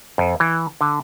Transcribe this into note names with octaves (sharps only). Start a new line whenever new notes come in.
F2
E3
D3